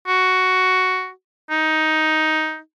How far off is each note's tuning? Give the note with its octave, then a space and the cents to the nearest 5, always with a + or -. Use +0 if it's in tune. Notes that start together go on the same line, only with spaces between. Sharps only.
F#4 +5
D#4 +10